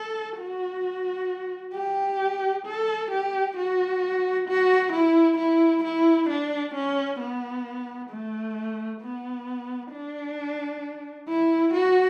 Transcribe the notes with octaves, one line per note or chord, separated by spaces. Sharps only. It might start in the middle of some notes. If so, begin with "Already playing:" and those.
Already playing: A4
F#4
G4
A4
G4
F#4
F#4
E4
E4
E4
D4
C#4
B3
A3
B3
D4
E4
F#4